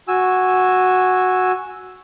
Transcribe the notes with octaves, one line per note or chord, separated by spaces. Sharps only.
F#4 G#5 E6